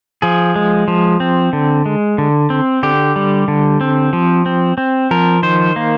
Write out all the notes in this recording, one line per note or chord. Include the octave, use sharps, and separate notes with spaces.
F3 G#4
G#3
F3
C4
D3
G#3
D3
C4
D3 G4
G3
D3
C4
F3
C4
C4
F3 A#4
D#3 C5
A#3